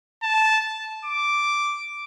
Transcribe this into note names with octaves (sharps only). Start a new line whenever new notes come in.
A5
D6